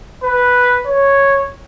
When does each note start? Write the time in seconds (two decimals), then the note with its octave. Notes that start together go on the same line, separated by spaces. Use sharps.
0.23 B4
0.86 C#5